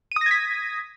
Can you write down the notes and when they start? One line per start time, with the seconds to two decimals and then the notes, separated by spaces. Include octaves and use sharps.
0.12 D#7
0.16 D#6
0.21 A#6
0.26 G#6
0.31 B6